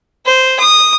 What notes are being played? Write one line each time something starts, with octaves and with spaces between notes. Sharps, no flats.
C5
D#6